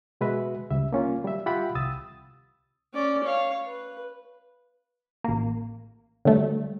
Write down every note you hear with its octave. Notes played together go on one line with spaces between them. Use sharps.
B2 G#3 F#4 B4 E5
C#2 G3 E5
A#3 C#4 F4
G3 E5
F4 G4 E5 F#5 G5 B5
C2 D#6 E6 A6
C#4 D5
C#5 F5
B4
A1 A#3
D3 F#3 G3 A3